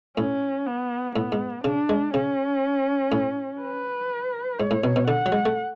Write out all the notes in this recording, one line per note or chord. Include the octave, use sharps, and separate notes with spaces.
A2 C#4
B3
A2 B3
G#2
C#3 D4
G#3
C#3 C#4
A2
B4
G#2 C#5
A2
B2
B2
D3 F#5
F#3
G#3
A3